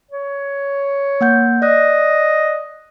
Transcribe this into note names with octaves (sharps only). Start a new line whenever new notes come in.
C#5
A#3 F#5 G6
D5 D#5 F#6